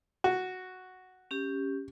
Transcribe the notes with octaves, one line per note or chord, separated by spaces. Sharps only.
F#4
C#4 G4